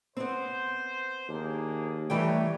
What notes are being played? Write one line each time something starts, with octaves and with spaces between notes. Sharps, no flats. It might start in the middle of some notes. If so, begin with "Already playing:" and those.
B3 C4 C5
D#2 A#3 D4 G#4
E3 G3 A3 D#4 B4 C#5 G5